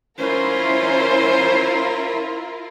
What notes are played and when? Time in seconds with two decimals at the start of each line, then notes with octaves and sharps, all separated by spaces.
0.19 C#4 E4 F4 A#4 C5